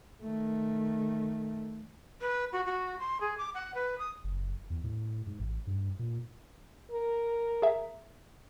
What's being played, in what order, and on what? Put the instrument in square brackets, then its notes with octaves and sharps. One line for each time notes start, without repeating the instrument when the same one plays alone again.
[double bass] D#3 A3
[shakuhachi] B4
F#4
F#4
C6
G#4
D6
F#5
B4
D#6
[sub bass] F#1
E2
A2
G#2
A1
G2
A#2
[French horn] A#4
[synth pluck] G#4 E5